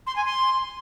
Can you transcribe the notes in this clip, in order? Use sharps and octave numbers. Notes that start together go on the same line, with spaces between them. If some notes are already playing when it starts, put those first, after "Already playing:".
C6
G#5
C6